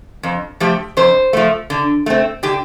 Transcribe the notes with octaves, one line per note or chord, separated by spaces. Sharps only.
F2
F3 A3 G4
F2 C5
F3 A3
D3
A3 C4
D3 G4